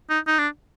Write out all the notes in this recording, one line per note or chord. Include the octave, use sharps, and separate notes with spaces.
D#4
D#4
D4